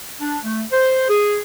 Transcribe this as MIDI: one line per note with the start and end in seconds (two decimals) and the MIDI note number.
0.20 0.38 62
0.43 0.63 57
0.72 1.06 72
1.08 1.41 68